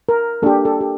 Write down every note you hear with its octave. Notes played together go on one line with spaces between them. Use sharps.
A#4
A#3 D4 G4 A4
A4
G4